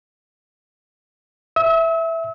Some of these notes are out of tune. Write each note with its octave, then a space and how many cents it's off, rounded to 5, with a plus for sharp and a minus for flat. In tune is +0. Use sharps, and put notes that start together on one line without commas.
E5 +0 E6 -40